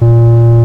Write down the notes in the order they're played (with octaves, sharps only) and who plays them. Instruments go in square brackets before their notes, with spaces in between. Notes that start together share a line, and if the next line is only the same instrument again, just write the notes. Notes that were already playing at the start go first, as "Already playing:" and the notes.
[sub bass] A#2